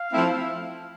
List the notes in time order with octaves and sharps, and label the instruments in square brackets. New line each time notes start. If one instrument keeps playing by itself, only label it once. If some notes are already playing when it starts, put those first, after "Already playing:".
Already playing: [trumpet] F5
[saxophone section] F3 A3 C4 E4